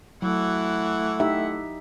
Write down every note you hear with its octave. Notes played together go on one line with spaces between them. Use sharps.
E3 F#3 A3 E4 F#5
D#4 G4 E5